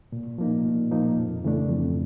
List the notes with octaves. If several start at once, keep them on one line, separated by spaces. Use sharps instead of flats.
A#2
F3 A#3 D#4
A#2
F3 A#3 D#4
F2
C#3 E3 A3 D4
F2